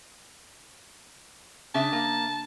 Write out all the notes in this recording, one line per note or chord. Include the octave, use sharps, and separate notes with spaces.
C#3 D4 E5 A5
A#3